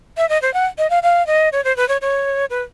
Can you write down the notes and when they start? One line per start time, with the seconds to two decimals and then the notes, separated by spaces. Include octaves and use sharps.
0.17 E5
0.29 D#5
0.42 C5
0.54 F#5
0.78 D#5
0.90 F5
1.03 F5
1.27 D#5
1.52 C#5
1.64 C5
1.77 B4
1.89 C#5
2.01 C#5
2.50 B4